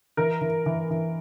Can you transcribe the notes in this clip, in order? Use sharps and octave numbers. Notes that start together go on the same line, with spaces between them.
E3 A#4
E3
E3
E3